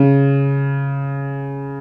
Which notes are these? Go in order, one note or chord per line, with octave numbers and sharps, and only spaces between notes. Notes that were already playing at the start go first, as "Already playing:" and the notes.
Already playing: C#3